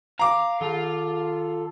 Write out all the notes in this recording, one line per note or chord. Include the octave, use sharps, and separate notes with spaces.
F5 A#5 D6
D#3 F4 A4